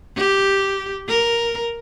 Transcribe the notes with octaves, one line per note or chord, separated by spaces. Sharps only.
G4
A#4